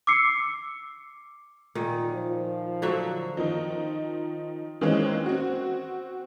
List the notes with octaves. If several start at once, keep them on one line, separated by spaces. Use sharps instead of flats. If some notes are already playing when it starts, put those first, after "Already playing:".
D6 E6 C7 C#7
A#2 D#3
F3
D3 F#3 E5
D#3 F3 D#4
D#3 E3 G#3 A#3 C4 C#4
C4 F#4